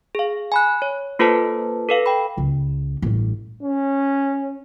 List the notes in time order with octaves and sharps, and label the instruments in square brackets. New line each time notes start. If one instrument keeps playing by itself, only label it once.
[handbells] G#4 F5
G#5 B5 F#6
C#5
A#3 F4 A4 B4 C5 A5
A4 B4 F5
G5 B5
[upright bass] C#2
A1 G2
[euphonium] C#4